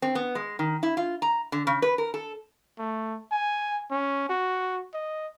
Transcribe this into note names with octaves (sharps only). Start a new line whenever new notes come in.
C4
B3
G#3
D#3
E4
F4
A#5
D3
C#3
B4
A#4
A4
A3
G#5
C#4
F#4
D#5